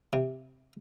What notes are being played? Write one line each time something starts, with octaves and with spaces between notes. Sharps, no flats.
C3